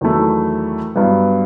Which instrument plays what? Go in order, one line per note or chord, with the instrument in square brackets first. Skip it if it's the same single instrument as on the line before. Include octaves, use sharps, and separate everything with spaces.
[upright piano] E2 D#3 F#3 A3 E4
G2 F#3 B3